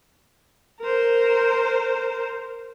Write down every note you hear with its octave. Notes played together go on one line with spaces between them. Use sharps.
A#4 C5